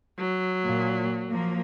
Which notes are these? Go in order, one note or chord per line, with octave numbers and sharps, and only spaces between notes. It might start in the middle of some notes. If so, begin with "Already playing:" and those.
F#3
A#2
F3 A#3